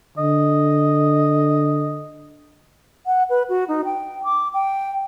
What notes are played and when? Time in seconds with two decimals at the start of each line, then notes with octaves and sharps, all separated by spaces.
0.18 D3 D#5
3.06 F#5
3.30 B4
3.49 F#4
3.68 D#4
3.85 G5
4.24 D6
4.54 G5